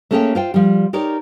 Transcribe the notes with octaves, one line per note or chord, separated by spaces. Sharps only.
A3 A#3 C#4 G#4 C#5 G5
F4 C5 G5
F3 G3
D#4 G4 A#4 C#5 D5